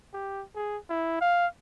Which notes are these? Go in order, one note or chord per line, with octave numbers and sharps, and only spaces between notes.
G4
G#4
E4
F5